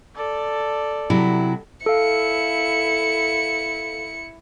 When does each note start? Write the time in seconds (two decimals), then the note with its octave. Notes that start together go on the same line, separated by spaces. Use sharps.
0.16 A4 D5
1.10 C3 F#3 E4
1.86 E4 A4 F5 C#7